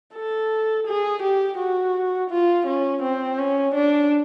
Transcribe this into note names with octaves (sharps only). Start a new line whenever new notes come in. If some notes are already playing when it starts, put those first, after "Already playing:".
A4
G#4
G4
F#4
F4
C#4
C4
C#4
D4